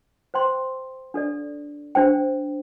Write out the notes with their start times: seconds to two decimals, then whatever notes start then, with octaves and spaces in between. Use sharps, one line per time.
0.34 C5 G5 C6
1.14 D4 A4 D5
1.95 D4 C5 G5